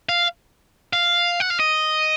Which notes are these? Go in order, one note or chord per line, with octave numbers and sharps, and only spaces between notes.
F5
F5
F#5
F5
D#5